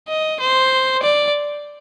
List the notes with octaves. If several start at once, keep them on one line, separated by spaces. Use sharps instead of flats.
D#5
C5
D5